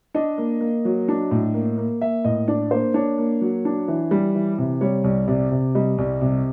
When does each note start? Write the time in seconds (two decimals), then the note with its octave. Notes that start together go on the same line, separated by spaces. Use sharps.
0.14 D4 D#5
0.38 A#3
0.61 A#3
0.85 F#3
1.08 D4
1.31 A2
1.54 A#3
1.78 A#3
2.01 A#3 E5
2.24 A2 D#5
2.48 D4 D5
2.71 A#3 C5
2.94 D4 C#5
3.18 A#3
3.41 F#3
3.65 D4
3.88 E3
4.11 G3
4.35 E3
4.58 C3
4.81 G3 C#5
5.04 C2
5.28 C3 D5
5.51 C3
5.75 G3 D#5
5.98 C2
6.21 C3